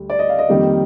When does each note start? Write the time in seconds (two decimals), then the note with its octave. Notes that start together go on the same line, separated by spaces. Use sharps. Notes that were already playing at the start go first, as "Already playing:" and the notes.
Already playing: D2 G3
0.10 D5
0.19 D#5
0.29 F5
0.39 D#5
0.49 F2 D#3 G3 A#3